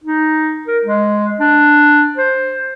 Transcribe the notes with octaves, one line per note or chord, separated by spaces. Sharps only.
D#4
A#4
G#3
D4
C5